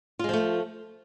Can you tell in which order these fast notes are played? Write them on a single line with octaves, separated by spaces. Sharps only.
F4 G#3 F3 A3